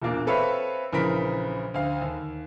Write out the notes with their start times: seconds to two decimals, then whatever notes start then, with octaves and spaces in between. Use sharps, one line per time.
0.02 E1 A#2 A#3 D4
0.27 C4 A4 B4 C#5 E5 F5
0.93 A#1 C#3 E3 A#4 B5 B6
1.74 D2 F5
2.02 D#2